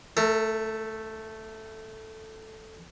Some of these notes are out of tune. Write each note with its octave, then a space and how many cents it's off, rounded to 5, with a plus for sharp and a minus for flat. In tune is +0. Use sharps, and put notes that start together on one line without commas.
A3 +0 A#4 -40